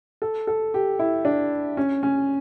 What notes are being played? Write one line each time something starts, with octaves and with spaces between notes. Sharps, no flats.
A4
A4
G4
E4
D4
C#4
C#4